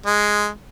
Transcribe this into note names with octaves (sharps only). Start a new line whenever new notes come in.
G#3